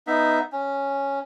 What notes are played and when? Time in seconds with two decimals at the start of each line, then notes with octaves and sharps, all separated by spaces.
0.07 B3 D#4 E5
0.52 C#4